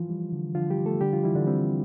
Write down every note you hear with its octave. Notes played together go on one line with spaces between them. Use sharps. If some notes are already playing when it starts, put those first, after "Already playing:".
Already playing: E3 F3 F4
G3
D3
D3 F3 F4
G3 G4
D3
A3 A4
D3 G3 G4
F3 F4
E3 G3 E4
D3 D4
G3 C4